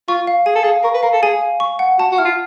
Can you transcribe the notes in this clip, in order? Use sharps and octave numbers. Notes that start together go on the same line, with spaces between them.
F4 C#6
F5
G#4 G#5
A4
G#4 F5
A#4 C#6
B4
A#4 F5
A4
G#4 G#5
F5
C#6
F#5
F#4 A5
F#4
E4 F6
F4